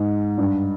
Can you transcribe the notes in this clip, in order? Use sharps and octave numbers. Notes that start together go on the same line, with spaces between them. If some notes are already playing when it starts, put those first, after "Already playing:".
Already playing: G#2
G2